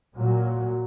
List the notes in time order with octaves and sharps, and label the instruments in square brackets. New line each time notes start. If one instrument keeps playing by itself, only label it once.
[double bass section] A#2 F#3